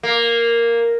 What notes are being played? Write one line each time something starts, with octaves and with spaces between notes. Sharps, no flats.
A#3